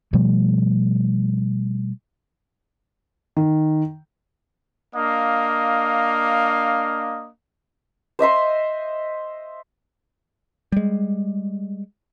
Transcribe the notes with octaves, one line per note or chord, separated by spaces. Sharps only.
B2 F3 G3 A3
D#3
A#3 D4 D#5 F5
C5 D#5 E5 C6
G3 G#3